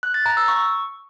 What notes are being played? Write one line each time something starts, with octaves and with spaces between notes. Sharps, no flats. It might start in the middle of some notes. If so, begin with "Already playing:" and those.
F#6
A6
A#5
E6
C#6